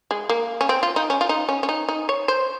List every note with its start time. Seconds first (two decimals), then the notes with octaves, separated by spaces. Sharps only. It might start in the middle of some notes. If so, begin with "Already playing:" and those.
0.11 G#3
0.29 A#3
0.61 C#4
0.69 C4
0.83 F4
0.96 D#4
1.10 C#4
1.21 F4
1.29 D#4
1.49 C#4
1.63 C#4
1.69 D#4
1.89 D#4
2.09 C#5
2.28 C5